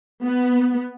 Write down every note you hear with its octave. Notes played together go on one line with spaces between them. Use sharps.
B3